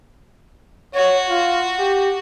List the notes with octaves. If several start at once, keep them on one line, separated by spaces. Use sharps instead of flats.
F#4 C#5
F4
G4